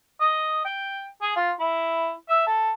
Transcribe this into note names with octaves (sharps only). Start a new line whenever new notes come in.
D#5
G5
G#4
F4
E4
E5
A4